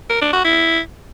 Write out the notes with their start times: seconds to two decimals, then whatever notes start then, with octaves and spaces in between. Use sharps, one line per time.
0.10 A#4
0.21 D4
0.33 F#4
0.44 E4